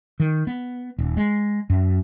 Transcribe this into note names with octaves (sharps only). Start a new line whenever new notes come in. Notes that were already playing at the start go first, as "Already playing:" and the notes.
D#3
B3
D#1
G#3
F#2